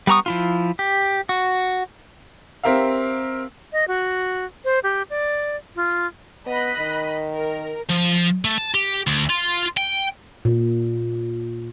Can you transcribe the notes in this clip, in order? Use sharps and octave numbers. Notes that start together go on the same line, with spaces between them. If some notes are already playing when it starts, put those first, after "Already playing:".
G3 B3 A#5 C#6 D#6
F3 E4 F4
G4
F#4
C4 G4 A#4 E5 F5
D#5
F#4
C5
G4
D5
F4
B3 D#5 B5 F#6
D#3
A#4
F3
A3
A5
G4
D2
F4
G5
A#2